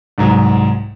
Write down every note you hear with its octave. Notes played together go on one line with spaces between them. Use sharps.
C2 G#2 F#3